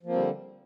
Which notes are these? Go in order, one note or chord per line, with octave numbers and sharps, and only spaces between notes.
D3 F3 G3 A#3 C4